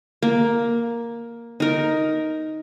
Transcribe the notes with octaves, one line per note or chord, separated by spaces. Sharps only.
A#3
D#4 A#4